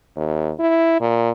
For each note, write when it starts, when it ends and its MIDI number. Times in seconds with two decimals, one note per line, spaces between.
0.16 0.53 39
0.59 0.99 64
1.01 1.31 46